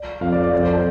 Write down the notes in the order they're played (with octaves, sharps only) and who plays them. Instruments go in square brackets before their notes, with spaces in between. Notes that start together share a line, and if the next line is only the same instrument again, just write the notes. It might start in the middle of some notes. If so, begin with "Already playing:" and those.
Already playing: [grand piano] D5
[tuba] F2 [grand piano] F5
[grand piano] D5
D5
[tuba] F2 [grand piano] D5
[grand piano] C5
A4